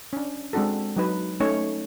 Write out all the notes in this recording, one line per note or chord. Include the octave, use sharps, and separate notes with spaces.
C#4 D4
G#3 C4 D4 F#4 A4
F#3 D#4 B4
A3 C#4 D#4 C#5